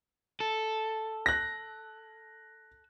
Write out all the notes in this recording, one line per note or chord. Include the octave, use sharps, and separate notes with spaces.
A4
F#6 A#6